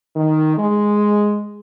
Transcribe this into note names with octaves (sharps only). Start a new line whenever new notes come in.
D#3
G#3